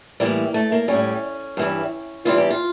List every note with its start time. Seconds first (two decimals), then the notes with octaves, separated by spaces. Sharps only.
0.20 A2 E3 G3 A#3
0.54 A3
0.72 A#3
0.88 A2 G3 C#4
1.57 G2 E3 G3
2.25 E2 E3 G3 F4
2.38 G4
2.50 F4